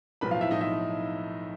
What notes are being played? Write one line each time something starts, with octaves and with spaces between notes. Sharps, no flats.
B1 A2 F3 B4 B5
F4 F5
E4 E5
B1 A2 F3 D#4 D#5
E4 E5